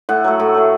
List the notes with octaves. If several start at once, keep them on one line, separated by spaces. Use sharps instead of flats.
A2 F#5
F#3 A3
A2
F#3 A3